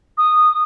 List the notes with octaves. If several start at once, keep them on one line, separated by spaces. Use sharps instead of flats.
D#6